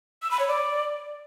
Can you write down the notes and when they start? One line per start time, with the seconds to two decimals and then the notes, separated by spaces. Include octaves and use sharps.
0.23 E6
0.31 B5
0.40 C#5
0.48 D5